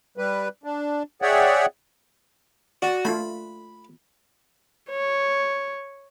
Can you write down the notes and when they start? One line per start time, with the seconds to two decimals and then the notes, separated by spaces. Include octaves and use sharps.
0.17 G3 B4
0.64 D4
1.22 G#4 C#5 D5 E5 F#5 G5
2.82 F#4 D5
3.05 A3 F4 B5
4.90 C#5